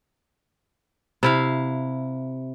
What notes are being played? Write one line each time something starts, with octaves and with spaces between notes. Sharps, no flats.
C3 E4 F5